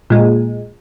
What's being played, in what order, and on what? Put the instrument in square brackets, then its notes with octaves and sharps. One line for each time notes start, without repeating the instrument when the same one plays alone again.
[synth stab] A#2 G#3